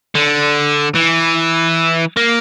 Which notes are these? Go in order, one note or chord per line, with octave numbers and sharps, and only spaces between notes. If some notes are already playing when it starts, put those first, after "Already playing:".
D3
E3
A#3